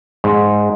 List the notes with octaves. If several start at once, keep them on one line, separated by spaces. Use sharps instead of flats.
G#2